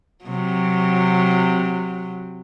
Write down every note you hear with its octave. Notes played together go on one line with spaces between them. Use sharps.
C3 F#3